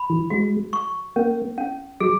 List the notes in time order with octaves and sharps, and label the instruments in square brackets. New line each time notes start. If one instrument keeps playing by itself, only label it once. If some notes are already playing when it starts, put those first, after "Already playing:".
Already playing: [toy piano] B5
[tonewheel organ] E3
[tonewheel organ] G#3 [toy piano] F#4
[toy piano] C#6
[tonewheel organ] A#3 [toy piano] C#4
[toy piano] C#4
[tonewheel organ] F#3 [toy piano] G#4